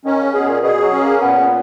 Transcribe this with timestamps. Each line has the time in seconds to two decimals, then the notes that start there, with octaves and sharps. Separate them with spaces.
0.05 D#3 C#4
0.19 C#3
0.34 B2 G#4
0.48 A#2
0.62 B2 G#4
0.82 F#3
0.92 C#4
1.02 A#3
1.21 A#2 B3